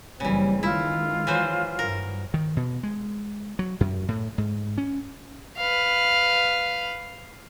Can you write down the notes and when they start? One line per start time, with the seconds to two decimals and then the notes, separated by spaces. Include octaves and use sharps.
0.20 F#1 C#3 E3 G3 C4
0.63 D#3 G#3 E4 F4
1.27 E3 F#3 C5
1.79 G2 A#4
2.34 D#3
2.57 B2
2.83 G#3
3.59 F#3
3.81 F#2
4.08 A2
4.38 G#2
4.78 C#4
5.57 B4 F5